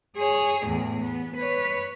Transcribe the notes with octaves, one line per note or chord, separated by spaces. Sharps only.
G#4 C#5
E2 A2
B3
B4 C#5